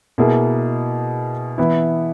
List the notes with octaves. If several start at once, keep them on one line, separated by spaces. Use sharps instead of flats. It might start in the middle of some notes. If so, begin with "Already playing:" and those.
B2 A#3 E4 G#4
E3 B3 E4